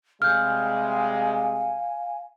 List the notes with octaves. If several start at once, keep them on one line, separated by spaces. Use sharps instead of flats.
C3 G3 G#3 F5 G#5 F6 G6